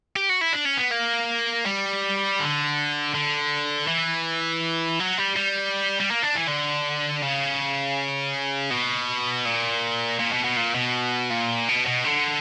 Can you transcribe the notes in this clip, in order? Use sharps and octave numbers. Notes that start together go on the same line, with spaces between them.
G4
F#4
E4
D4
C#4
B3
A#3
G3
D3
D3
E3
F#3
G3
G3
G3
A#3
D4
E3
D3
C#3
B2
A#2
A#2
B2
B2
A#2
B2
A#2
B2
B2
D3